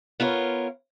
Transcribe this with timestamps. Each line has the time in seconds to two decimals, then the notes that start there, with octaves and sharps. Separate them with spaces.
0.20 B3 F4 A#4 C#5